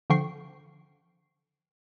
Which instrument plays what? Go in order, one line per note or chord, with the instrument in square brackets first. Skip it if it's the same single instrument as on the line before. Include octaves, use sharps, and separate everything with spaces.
[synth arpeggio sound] D3 F3 G5 C#6 C7